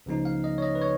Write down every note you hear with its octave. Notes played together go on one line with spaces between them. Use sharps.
C#2 C#3 F3 A#3 D#4
F5
D#5
C#5
D#5
B4
C#5